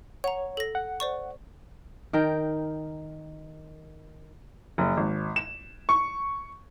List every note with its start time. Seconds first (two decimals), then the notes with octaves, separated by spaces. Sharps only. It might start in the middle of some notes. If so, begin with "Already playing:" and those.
0.24 C#5 F#5 A#5
0.57 A4 A#6
0.75 F#5
1.00 C5 D5 C#6
2.13 D#3 A#4 G5
4.78 F#1
4.97 G#1
5.36 E7
5.89 C#6